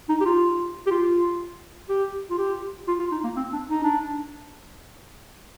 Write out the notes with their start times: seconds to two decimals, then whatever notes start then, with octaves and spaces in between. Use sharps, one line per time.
0.09 D#4
0.21 G4
0.25 F4
0.87 G4
0.91 F4
1.89 G4
2.30 F4
2.39 G4
2.88 F4
2.99 F4
3.12 D#4
3.24 A#3
3.37 C4
3.53 D4
3.70 D#4
3.84 D4